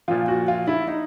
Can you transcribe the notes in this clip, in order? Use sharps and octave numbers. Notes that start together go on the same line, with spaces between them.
A#2 F3 F4
F#4
F4
E4
D#4